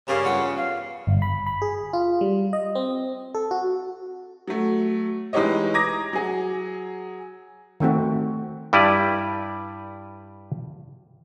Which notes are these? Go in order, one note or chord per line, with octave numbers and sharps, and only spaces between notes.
G2 C#3 G4 A#4 F5
E2 F4 F#5 G5
F5
G1
B5
B5
G#4
F4
G3
D#5
C4
A4
F#4
F#3 A3
E3 G#3 D#4 G4 C#5 D#5
A#5 D6 D#6 G#6 A#6
F#3 G#4
D#3 A3 C4 F#4
G2 G3 E4 G4 B4 D5